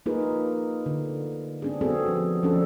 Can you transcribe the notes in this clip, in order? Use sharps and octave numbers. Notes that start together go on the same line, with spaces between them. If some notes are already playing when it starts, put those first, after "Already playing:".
A#3 D#4 F4 G#4 A#4 B4
D3
C4 D4 G#4
B3 C4 F#4 G#4 A4
F3
F3 C#4 D4 A4